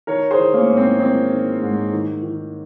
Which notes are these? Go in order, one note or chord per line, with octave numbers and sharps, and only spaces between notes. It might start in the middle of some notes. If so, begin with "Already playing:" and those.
D#3 A#4 C#5
G#4 C5
D#3
A#3 C#4
G#2
C4
D#3 C4
D#3
G#2
D#3
D#3